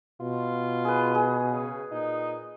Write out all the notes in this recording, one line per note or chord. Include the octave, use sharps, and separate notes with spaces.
B2 F4
G#4 B4
G#4
C#3
A#2 D#4